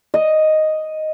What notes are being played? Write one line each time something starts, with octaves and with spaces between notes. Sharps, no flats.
D#5